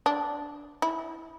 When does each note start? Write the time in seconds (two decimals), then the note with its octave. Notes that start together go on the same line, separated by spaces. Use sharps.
0.06 D4
0.82 E4